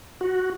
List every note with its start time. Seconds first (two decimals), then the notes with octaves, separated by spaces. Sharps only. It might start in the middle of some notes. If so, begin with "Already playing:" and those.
0.21 F#4